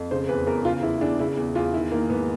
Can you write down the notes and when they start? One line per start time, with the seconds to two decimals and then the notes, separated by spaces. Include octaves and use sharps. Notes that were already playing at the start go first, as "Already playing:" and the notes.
Already playing: F2
0.11 C#3 C5
0.28 E2 B4
0.47 E2 A#4
0.65 C#3 F4
0.82 E2 E4
1.01 E2 D4
1.19 C#3 E4
1.37 E2
1.55 E2 F4
1.73 D#3 E4
1.92 D#3 A#3
2.09 G#2 B3